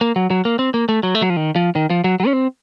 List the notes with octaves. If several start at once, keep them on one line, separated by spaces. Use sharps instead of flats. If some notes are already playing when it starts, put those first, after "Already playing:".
A#3
F#3
F#3
A#3
C4
A#3
A3
F#3
A3
F#3
F3
D#3
F3
D#3
F3
F#3
F#3
C#4
C4